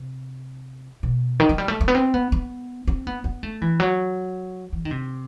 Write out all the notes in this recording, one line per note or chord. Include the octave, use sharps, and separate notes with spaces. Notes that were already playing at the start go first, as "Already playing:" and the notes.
Already playing: C3
B2
D#3
F#3
G3
A3
A3
B3
C4
B3
B3
C4
B3
B3
A3
E3
F#3
E3
D#3
C3